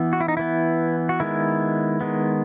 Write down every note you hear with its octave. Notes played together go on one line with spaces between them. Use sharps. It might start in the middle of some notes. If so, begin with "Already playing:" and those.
Already playing: E3 B3
F#4
E4
D#4
E3 B3 E4
F#4
D#3 G#3 B3 E4
D#3 G#3 B3